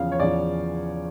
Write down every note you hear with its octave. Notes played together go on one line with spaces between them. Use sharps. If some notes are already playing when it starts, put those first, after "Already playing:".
Already playing: E2 C#3 F3 F5
C#5
E2 C#3 F3 D5